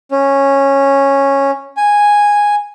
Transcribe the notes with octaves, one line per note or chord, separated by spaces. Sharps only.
C#4
G#5